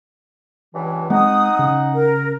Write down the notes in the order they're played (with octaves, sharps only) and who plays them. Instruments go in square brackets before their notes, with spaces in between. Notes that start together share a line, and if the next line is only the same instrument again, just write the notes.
[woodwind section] C#2 G2 E3
[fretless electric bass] G#3 C4 [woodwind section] D#4 F#5 [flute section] D#6
[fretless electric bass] C#3
[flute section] A#4